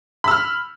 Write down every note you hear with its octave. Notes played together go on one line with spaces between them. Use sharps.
B5 E6 F6